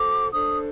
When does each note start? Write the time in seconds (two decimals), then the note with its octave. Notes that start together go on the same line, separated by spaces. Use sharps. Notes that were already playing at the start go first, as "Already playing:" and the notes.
Already playing: F#4 A4 C5 D6
0.33 D4 A4 C5 D#6